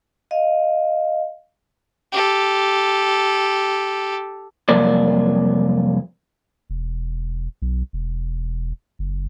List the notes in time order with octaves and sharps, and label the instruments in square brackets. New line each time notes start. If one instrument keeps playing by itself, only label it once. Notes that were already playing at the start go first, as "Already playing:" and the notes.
[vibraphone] D#5 F5
[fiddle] G4 A4
[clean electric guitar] C2 F2 F#3 A#3 D5
[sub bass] E1
B1
E1
F#1